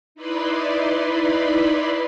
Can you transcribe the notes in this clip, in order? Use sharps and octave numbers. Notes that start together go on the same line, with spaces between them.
D#4 E4 B4 D5 B5 C6